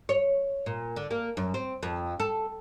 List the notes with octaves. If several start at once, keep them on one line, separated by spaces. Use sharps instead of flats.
C#5
A#2
D3
A#3
F#2
C4
F2
A4